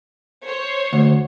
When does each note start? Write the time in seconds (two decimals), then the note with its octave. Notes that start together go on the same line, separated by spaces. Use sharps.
0.46 C5 C#5
0.93 D2